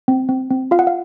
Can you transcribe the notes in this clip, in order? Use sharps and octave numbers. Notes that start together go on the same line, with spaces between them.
C4
C4
C4
F4 F5
F#5
F5